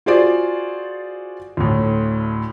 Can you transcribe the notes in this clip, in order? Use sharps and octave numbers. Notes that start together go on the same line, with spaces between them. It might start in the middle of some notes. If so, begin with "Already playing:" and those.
F4 F#4 G#4 C5 D5
D2 A2